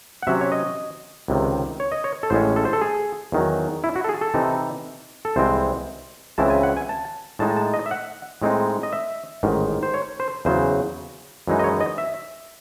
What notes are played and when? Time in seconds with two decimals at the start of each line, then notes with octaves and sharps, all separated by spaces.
0.22 F#5
0.27 C3 F#3 C#4 E5
0.41 C#5
0.52 D#5
1.28 C#2 C3 D#3
1.80 C#5
1.92 D#5
2.04 C#5
2.23 A4
2.30 A1 A2 G#3 C#4 C5
2.56 A4
2.65 C5
2.73 A4
2.81 G#4
3.32 E2 D#3 F#3
3.84 E4
3.96 F#4
4.04 A4
4.09 G#4
4.21 A4
4.34 C3 E3 C4 D#4
5.25 A4
5.36 C2 C3 E3 G#3 C4 C5
6.38 C#2 C#3 E3 C4 E4 A5
6.50 G#5
6.63 F#5
6.77 G#5
6.89 A5
7.39 A2 G#3 D#4 A5
7.57 A5
7.74 D#5
7.86 E5
7.91 F#5
8.42 A2 G#3 C4 D#4
8.83 D#5
8.93 E5
9.43 A1 G#2 D#3
9.83 C5
9.94 C#5
10.20 C5
10.45 E2 C#3 F#3 C5
11.47 F#2 E3 G#3 D#4
11.59 D#5
11.64 C#5
11.81 D#5
11.98 E5